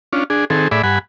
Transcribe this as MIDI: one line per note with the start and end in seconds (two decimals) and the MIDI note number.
0.13 0.24 61
0.13 0.24 62
0.13 0.24 65
0.30 0.45 62
0.30 0.45 68
0.50 0.68 51
0.50 0.68 60
0.50 0.68 68
0.50 0.68 69
0.71 0.82 45
0.71 0.82 68
0.71 0.82 74
0.71 0.82 76
0.71 0.82 83
0.83 0.99 43
0.83 0.99 78
0.83 0.99 80
0.83 0.99 83